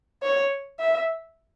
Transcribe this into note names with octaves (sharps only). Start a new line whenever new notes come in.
C#5
E5